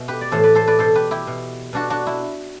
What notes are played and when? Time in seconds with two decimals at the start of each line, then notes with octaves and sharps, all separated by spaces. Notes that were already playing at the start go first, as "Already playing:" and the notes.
Already playing: B2 E5
0.08 G4 B4
0.21 D5
0.32 A2 E3 A4 C5
0.43 B4 D5
0.55 A4 C5
0.67 B4 D5
0.79 B2 A4 C5
0.95 G4 B4
1.11 E4 G4
1.27 B2
1.73 B2 D4 F#4
1.90 D4 F#4
2.07 E4